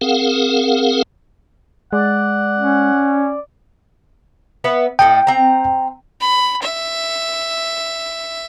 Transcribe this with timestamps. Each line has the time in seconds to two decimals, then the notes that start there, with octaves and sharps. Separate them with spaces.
0.01 C4 G#4 A#4 F5 F#5
1.93 G#3 D5 F#5
2.59 C#4
4.64 B3 B4 E5
4.99 A2 A4 D#5 G5
5.27 C4 A#5
6.21 B5
6.62 E5